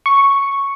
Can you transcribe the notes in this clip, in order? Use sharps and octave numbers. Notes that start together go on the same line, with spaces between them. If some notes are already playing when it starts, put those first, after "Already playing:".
C#6